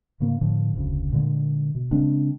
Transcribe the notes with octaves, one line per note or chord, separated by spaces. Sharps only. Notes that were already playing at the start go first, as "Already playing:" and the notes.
G#2 C#3 A#3
A2 D3 F3
F1 D2 C#3
A#2 D3 G#3
B2
C#3 G#3 C4 D4